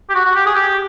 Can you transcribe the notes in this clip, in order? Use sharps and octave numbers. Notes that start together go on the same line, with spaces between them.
G4
F#4
F#4
G4
G#4
G4